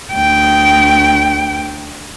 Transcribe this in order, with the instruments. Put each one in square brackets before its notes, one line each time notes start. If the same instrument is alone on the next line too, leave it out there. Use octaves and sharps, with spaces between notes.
[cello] D2 G5